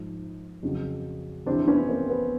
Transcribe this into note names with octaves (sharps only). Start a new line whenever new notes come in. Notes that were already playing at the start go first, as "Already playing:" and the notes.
Already playing: G#2 F3 D#4
F2 C#3 F#3
F2 C3 E3 C4 D4
B3 C#4
A#3 C4
B3